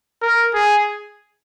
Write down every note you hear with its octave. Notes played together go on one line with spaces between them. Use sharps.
A#4
G#4